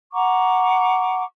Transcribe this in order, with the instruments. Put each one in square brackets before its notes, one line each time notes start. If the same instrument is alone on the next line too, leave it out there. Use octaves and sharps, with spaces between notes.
[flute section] F#5 A#5 C#6 D6